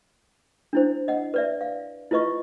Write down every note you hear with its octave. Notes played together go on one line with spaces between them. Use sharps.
D4 E4 C5
D#5 F#5
B4 D5 E5
F5
E4 F4 B4 D#5 C#6